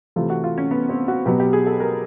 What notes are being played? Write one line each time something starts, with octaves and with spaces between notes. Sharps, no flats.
C3 E3 A3 F4
F#4
F4
C#4
B3
C4
F#4
B2 F#3 B3 G4
G4
G#4
A4
A#4